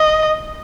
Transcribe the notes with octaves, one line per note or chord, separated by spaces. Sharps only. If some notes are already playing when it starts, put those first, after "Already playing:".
Already playing: D#5